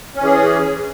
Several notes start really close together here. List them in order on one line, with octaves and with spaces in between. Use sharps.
C#4 E3 G#4